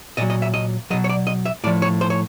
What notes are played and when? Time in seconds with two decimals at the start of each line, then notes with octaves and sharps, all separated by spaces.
0.17 A#2 F#3 D#5
0.30 D#5
0.42 E5
0.54 D#5
0.90 B2 F#3 D#5
1.04 C#5
1.09 D5
1.27 D#5
1.46 E5
1.64 A2 D5
1.67 F3
1.82 C#5
2.01 C5
2.10 C#5